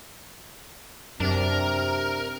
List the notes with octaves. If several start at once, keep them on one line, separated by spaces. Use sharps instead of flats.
F#2 C3 D4 A#4